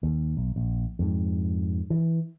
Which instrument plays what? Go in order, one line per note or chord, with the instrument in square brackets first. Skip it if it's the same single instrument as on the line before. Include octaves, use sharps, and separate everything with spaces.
[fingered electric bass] D#2
B1
A#1
F2 G#2
E3